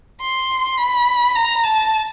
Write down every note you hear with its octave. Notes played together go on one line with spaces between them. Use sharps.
C6
B5
A#5
A5